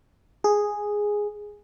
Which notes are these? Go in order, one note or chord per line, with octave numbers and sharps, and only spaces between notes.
G#4